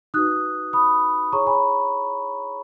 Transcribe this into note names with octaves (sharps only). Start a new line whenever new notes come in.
D#4 F#4 B4 D#6 F#6
B5 D#6
E4 G#4 C#5 A#5 C#6
G#5 B5